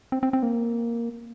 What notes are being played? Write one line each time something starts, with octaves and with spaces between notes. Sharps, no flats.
C4
C4
C4
A#3